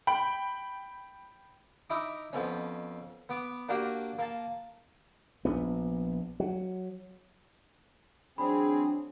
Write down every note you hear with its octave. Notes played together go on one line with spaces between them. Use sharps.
G5 B5
D#4 E4 A#5 D6
F2 B2 C#4
B3 D6
A#3 D4 F#4 G4 A#4
A#3 A5
A#1 B3
F#3
E3 F#3 C4 D4 G#4 B5